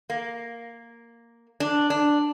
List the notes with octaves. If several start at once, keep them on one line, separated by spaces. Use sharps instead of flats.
A#3
D4
D4